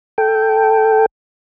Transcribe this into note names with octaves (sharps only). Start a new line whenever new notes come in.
A4 G5